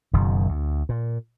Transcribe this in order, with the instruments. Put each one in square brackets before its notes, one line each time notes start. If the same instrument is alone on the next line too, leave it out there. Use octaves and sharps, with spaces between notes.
[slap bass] F#1 F#2 B2 D#3
D2
A#2